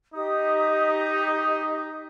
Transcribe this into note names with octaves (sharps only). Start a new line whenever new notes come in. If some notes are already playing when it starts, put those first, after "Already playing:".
D#4 G4 D#5 D#6